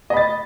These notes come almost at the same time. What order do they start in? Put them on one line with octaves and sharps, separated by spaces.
D#5 B5 A6